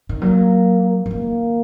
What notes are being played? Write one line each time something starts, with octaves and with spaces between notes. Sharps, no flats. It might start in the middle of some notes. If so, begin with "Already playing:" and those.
D#3
F#3 A#3
F#3
D#3 A#3